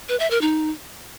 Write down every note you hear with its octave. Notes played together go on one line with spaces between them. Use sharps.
B4
E5
A#4
D#4